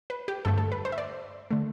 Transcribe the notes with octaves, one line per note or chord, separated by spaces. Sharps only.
B4
G4
G2 D3 A3 A4
A4
B4
C5
E5
D5
D3 A3